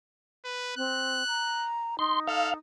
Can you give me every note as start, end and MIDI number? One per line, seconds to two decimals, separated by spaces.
0.45 0.75 71
0.77 1.26 60
0.77 1.68 90
1.27 1.98 82
1.99 2.58 63
1.99 2.20 84
2.28 2.53 69
2.28 2.54 77